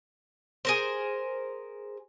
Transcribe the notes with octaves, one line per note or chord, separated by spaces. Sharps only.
G#4 A#4 C5